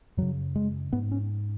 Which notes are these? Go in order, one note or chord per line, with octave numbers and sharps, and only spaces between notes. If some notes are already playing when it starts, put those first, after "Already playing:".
F#2 C#3 F#3
G#3
G#2 B3
C#4